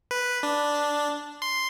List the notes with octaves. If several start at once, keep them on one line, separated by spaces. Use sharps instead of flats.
B4
D4
C6